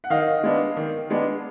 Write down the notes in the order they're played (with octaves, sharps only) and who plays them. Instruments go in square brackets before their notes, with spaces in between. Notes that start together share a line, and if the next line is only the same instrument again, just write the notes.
[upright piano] F#5
D#3 D#5 F5
G#3 B3 D4
D#3
G#3 B3 D4